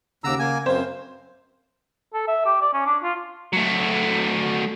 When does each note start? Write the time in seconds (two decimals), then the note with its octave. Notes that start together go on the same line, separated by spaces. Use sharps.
0.24 D#2 C#3 F#5 A#5 D6 E6
0.39 A#3 G#5
0.66 F#2 C4 B4 C5 F5
2.14 A4
2.28 E5
2.45 G4
2.61 D5
2.73 C#4
2.86 D4
3.03 F4
3.53 F#3 A3